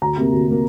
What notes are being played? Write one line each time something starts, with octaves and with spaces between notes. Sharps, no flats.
D2 A#5
C3 A#3
D2
C3 A#3